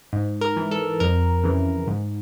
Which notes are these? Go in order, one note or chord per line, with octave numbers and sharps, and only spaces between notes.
G#2
A#4
E3
A4
F2 A#4
C#3 E3
G#2